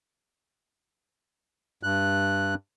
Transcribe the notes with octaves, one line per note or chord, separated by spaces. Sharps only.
G2 F#6